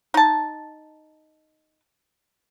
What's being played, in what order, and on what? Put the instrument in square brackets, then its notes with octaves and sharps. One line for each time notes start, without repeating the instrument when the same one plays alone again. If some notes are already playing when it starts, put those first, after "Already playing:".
[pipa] D#4 A5